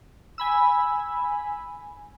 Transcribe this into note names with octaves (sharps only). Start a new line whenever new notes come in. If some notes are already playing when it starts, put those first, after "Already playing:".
G#5 B5 E6